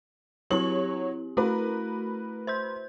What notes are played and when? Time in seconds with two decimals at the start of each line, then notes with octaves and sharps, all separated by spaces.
0.50 F#3 C4 E4 G4 C#5 F#7
1.37 A3 E4 F#4 A#4 B4
2.47 C5 C6 G6